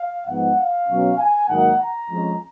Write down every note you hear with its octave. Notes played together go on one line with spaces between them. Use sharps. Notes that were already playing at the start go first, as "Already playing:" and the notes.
Already playing: F5
G#2 F3 B3 D#4 F#5
F5
B2 F#3 C#4
G#5
G#2 D#3 F#3 A#3 D#4 F#5
A#5
F2 F3 G#3 C#4